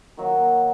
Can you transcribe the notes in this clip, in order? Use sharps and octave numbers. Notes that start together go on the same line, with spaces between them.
D#3 F#3 A#3